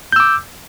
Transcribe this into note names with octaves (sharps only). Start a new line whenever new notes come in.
D6 E6 G6